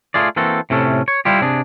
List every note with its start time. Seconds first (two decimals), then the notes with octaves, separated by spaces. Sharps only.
0.14 A3 F4 G#4 D5
0.36 E3 A#3 C4 F#4 A4
0.70 A2 C3 C#4 A4
1.08 C#5
1.25 G3 E4 F4 G4
1.41 C3 D4 G#4